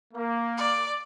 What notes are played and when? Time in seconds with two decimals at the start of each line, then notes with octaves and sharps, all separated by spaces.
0.14 A#3
0.57 D5